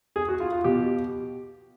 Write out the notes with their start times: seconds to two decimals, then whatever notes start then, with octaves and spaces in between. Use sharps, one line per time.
0.16 G#4
0.28 F#4
0.40 F4
0.52 F4
0.64 B2 G4